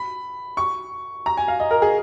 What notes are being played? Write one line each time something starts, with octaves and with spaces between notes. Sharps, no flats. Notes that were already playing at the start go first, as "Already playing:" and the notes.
Already playing: B5
C#6
A#5
G#5
F5
D#5
A#4
G#4